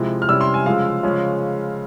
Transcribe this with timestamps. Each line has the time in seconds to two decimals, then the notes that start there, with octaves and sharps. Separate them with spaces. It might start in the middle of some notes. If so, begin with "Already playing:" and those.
Already playing: C3 F3 G#3 E4
0.22 F6
0.28 C3 G3 C#4 E4 E6
0.41 C6
0.54 G#5
0.66 C#3 F3 G#3 F5
1.03 C#3 F3 G#3 C#4